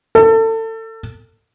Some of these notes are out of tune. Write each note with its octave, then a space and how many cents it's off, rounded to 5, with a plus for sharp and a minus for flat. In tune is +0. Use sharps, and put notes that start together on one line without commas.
A4 +30